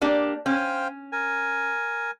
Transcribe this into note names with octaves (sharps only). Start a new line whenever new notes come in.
A#3 D4 G4
C#4 C5 F5 G5
A#4 G#5